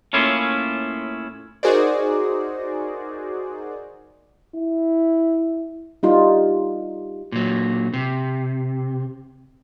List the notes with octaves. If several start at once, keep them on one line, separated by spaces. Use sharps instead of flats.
A2 A#3 C#4 E4 F4
D#4 F#4 G#4 A#4 C5 D5
E4
G3 D#4 F4
A#2 F#3
C3